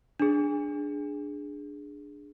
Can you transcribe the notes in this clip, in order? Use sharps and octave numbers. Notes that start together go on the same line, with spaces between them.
D4 G#4